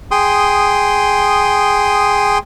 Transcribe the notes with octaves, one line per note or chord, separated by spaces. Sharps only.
G#4 G5 C6 D#6